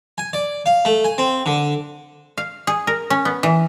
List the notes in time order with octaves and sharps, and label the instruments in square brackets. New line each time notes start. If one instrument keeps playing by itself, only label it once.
[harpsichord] G#5
D5
F5
A3
G#5
C4
D3
[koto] F5
G#4
A#4
C#4
B3
E3